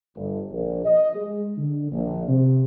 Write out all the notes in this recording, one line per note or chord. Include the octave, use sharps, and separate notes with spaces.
G1
A#1
D#5
G#3
D3
A#1
C3